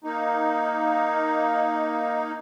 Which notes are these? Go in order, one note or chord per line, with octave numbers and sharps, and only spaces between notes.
A#3 D#4